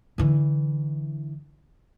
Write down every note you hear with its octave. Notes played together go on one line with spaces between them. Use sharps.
D3 E3